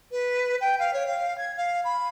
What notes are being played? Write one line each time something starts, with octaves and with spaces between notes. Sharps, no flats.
B4
G5
F5
C#5
F5
G#6
F5
B5